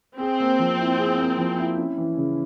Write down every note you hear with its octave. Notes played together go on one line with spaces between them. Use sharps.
C4 G#4
A#3
F3
E4
G#4
A#3
F3
E4
C#4
E3
C#3